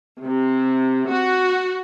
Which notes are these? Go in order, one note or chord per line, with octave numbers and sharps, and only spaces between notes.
C3
F#4